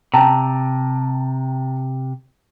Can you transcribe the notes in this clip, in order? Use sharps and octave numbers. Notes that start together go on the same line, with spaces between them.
C3 G5 A5 A#5